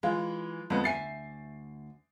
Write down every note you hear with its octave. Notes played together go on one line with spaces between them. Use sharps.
E3 G#3 F4
F2 G#3 B3
D2 E5 G#5 A6 C7